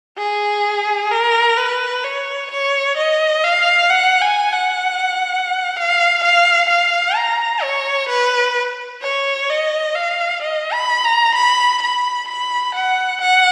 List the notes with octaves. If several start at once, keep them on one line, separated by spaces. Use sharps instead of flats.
G#4
A#4
B4
C#5
C#5
D#5
F5
F#5
G#5
F#5
F5
F5
F5
A#5
C#5
B4
C#5
D#5
F5
D#5
B5
A#5
B5
B5
B5
F#5
F#5